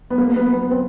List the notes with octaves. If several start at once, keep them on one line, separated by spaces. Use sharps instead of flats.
B3
A#3
B3
B3
C4